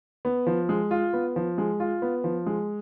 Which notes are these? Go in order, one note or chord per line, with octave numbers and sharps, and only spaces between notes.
B3
F3
G#3
F4
B3
F3
G#3
F4
B3
F3
G#3